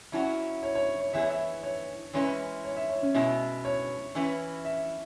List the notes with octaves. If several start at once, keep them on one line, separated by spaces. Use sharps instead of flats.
F#3 C#4 E4 F#4
C#5
C#5
C#5
E3 B3 E4 G#4 E5
C#5
E5
C#5
E3 G#3 C#4 E4 B4 C#5
C#5
E5
C#5
C#4
B2 G#3 E4 E5
C#5
E3 C#4 E4 B4
E5